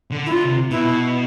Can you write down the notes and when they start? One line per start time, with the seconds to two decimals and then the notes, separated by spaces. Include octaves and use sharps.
0.11 D3
0.26 E4
0.31 D3 F4
0.44 C3
0.70 B2 E4